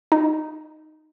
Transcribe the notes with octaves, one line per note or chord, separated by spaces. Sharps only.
D#4